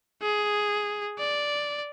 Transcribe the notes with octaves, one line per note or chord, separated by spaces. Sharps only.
G#4
D5